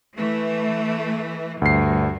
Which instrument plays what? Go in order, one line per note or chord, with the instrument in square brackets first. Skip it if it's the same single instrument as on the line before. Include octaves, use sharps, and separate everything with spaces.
[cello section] E3 A3
[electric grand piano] D2 C7 [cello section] G2